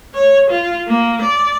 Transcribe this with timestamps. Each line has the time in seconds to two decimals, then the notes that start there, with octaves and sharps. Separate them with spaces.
0.15 C#5
0.50 F4
0.88 A#3
1.22 D5